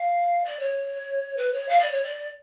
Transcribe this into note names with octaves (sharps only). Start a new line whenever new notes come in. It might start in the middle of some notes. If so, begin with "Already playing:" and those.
Already playing: F5
D5
C#5
B4
C#5
F5
D5
C#5
D5